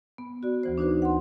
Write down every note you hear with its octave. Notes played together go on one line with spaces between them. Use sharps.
B3
F#4 D5
D2 E3 C5
D4 D#4 F#4 B4 C5
F#5 C6